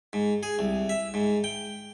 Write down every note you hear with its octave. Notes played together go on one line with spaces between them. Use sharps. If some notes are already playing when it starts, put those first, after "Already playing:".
G#2
G#4
C2
E5
G#2
G5